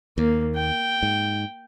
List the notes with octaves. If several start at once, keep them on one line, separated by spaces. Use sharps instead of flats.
D#2 A#3
G5
G#2